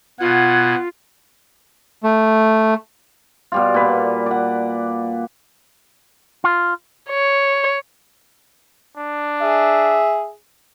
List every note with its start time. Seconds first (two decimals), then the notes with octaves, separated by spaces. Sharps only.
0.20 B2 F4 F#5 G#6
2.03 A3
3.52 B2 G3 F4
3.74 A#2 B4
4.26 D5 F#5
6.44 F4
7.10 C#5
8.97 D4
9.41 G#4 E5